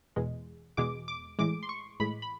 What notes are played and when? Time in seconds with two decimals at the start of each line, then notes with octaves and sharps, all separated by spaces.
0.16 E2 B2 G#3
0.77 E2 B2 G#3 D6
1.08 D6
1.39 A2 E3 G#3 D6
1.63 C6
1.69 C#6
2.00 A2 E3 G#3 B5
2.22 B5